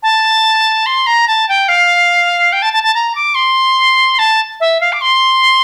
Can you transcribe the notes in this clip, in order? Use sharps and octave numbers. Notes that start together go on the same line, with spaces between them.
A5
C6
A#5
A5
G5
F5
G5
A5
A5
A5
A#5
D6
C6
A5
E5
F5
D6
C6